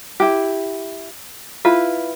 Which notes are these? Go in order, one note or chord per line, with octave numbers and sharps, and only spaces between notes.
E4 G4
E4 F4 B4